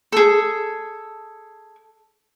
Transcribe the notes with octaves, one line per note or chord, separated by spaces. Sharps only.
G#4 A4